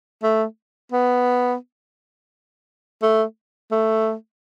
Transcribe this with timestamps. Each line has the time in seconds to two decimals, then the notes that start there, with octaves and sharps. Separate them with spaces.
0.23 A3
0.92 B3
3.02 A3
3.71 A3